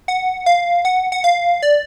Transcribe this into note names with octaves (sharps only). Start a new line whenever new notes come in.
F#5
F5
F#5
F#5
F5
D5